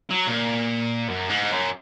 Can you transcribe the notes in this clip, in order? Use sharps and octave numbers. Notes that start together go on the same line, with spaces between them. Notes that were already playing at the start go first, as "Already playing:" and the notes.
F#3
A#2
F#2
G#2
F#2